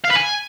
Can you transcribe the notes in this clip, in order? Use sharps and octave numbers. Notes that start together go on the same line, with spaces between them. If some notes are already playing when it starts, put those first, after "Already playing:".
F5
B4
G#5